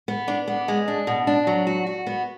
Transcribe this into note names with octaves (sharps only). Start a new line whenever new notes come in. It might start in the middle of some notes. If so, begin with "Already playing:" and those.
B3
D4
B3
G#3
D4
B2
D4
F#3
F#4
F#4
B3